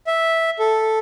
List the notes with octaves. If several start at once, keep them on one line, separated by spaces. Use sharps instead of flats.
E5
A4